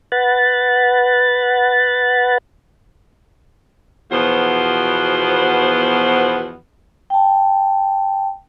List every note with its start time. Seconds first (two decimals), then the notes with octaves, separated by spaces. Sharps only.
0.12 B4 F#5 A6
4.12 E2 B2 F3 B3 F#4 C5
7.10 G5 A5